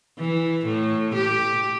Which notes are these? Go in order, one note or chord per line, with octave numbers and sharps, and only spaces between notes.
E3
A2
G4